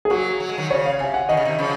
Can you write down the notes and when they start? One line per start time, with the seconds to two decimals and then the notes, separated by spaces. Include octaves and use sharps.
0.05 G#4
0.10 F#3 A#3 F#4
0.40 F#3
0.49 G#3
0.58 D#3 F#3
0.70 C#3 C#5
0.85 F5
0.99 C3 G#5
1.14 F#5
1.29 D#3 D#5
1.37 C#3
1.45 C3 D#3
1.59 C#3 F3